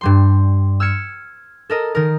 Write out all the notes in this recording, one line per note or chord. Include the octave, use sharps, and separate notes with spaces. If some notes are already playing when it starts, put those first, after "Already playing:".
G2 G3 C6
E6 F6 G#6 C#7 E7
A4 A#4 D#5
D#3 A#4